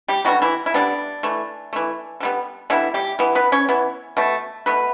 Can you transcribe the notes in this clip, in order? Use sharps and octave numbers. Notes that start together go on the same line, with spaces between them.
G3 G4
D3 F#3 G3 B3 F#4
E3 E4
E4
D3 G3 B3 D4
E3 A3
E3 A3
D3 G3 B3
D3 E3 G3 B3 E4
G3 G4
E3 B3
B3 B4
C#4 C#5
E3 B3
B2 A3
B2 A3 B3 B4